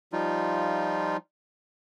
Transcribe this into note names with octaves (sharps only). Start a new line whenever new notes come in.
F3 G3 D#4 F4